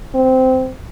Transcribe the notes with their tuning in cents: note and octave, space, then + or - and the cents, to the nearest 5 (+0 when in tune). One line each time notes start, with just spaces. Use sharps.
C4 -15